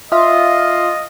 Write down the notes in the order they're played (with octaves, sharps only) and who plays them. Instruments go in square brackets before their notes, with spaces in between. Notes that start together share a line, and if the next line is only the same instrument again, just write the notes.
[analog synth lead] F4 [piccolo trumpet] D#5 [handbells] E5 D#6